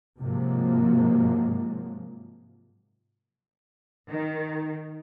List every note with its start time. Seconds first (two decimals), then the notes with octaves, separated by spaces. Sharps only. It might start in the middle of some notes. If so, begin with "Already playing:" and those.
0.18 G#2 C3 F3 F#3 G#3 A#3
4.09 D#3